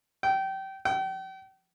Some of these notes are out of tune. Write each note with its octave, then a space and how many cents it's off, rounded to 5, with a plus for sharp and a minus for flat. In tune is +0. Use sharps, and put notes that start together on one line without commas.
G5 -25
G5 -40